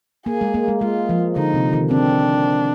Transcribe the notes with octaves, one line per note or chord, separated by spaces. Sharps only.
A#3 G#4
G#3
A#3
G#3
G#3 F4
F3
D3 D#4
C3
D#3
C4 D4